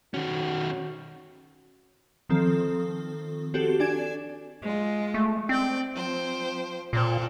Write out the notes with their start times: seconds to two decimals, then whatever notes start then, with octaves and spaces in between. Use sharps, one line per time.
0.14 D#3 C#4 F#4
2.29 D#3 F3 C4 A4
3.54 C4 F#4 G4 A4
3.80 D4 D5 G#5 G#6 E7
4.63 G#3 F4
5.14 A3
5.49 C4 D5 G5
5.94 F3 C5 G5
6.93 A#2 C4 A4